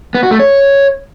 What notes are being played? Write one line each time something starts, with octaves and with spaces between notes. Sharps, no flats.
B3
F#4
A3
C#5